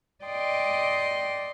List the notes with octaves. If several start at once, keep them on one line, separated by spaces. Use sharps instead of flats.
D5 D#5 G5 C6